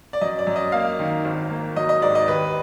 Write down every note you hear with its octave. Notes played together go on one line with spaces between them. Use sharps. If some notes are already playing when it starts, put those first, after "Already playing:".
D5
F#2 D#5
D5
F#2
D#5
A#3 F5
D#3
G#1
A#3
F#3 D#5
D#5
G#2 D5
D#5
D#2 B4